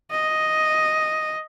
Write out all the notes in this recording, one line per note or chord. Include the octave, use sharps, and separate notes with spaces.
D#5